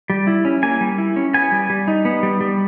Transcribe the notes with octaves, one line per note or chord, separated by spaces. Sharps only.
G3
E4
C#4
A#3 G#5
G3
E4
C#4
B3 G#5
G3
G3
D#4
B3
G3
G3